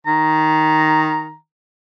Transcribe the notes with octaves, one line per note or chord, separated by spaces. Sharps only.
D#3 A#5